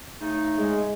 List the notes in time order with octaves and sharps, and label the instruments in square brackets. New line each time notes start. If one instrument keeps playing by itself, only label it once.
[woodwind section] C#3 A3 D#4
[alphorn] G#3